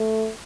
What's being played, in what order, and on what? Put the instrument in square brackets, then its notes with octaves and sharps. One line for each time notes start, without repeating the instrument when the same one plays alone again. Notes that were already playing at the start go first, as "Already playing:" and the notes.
Already playing: [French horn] A3